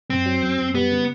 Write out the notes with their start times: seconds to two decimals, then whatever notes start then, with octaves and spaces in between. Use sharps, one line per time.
0.10 F#2 C4
0.26 F#3
0.43 F#2
0.58 F#2
0.75 G3 B3
0.92 C#3